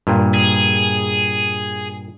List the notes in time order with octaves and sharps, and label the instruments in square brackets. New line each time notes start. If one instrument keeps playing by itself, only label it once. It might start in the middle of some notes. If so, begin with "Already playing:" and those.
[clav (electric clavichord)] G2 A#2
[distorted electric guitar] G#4